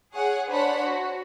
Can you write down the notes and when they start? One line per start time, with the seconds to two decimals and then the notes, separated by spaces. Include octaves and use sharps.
0.12 G#4 C#5 F#5
0.49 D4 C5 C#5 F#5 B5
0.85 F#4